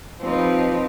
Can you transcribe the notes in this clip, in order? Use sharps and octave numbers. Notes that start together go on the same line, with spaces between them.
F3 C4 D#4 G4 B4